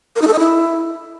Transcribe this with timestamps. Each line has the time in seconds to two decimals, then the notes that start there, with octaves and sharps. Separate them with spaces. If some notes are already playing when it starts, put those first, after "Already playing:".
0.16 A#4
0.22 D#4
0.27 A4
0.33 D#5
0.39 E4